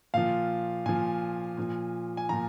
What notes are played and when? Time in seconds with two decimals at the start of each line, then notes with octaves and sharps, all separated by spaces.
0.14 A#2 F3 F5
0.86 A#2 F3 G#5
1.57 A#2 F3
2.17 G#5
2.29 A#2 F3 A#5